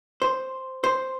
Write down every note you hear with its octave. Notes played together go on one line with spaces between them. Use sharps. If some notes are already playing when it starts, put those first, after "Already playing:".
C5
C5